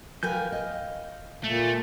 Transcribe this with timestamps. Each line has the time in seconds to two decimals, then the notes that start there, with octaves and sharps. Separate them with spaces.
0.23 A#4 B4 F5 G5 G#5 G6
0.52 D#5
1.44 A#2 A3